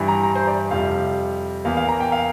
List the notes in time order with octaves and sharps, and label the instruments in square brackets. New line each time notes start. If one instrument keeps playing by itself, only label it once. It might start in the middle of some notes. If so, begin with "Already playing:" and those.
Already playing: [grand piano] G2 E3 G3
A#5
A#5
C5
D5
F2 C3 G3 F5
E2 E3 A#3 F5
F5
A#5
G5
F5